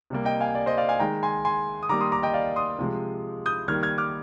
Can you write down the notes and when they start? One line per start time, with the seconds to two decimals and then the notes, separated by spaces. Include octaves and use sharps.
0.10 C3 G3 A#3
0.25 D#5 G5
0.41 F5 G#5
0.55 D5
0.66 C5 D#5
0.77 D5 F5
0.89 F5 G#5
1.00 D#3 G#3 G5 A#5
1.23 G#5 C6
1.45 G#5 C6
1.83 D#6
1.89 D#3 G3 A#3 A#5 D6
2.01 C6 D#6
2.12 A#5 D6
2.23 D#5 G5
2.34 D5 F5
2.56 C6 D#6
2.79 C3 F3 G#3
3.46 D#6 G6
3.68 D#3 G3 A#3 F6 G#6
3.83 F6 G#6
3.98 D6 F6